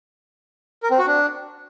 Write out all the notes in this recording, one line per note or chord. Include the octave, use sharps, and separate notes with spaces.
A#4
C4
F#4
D4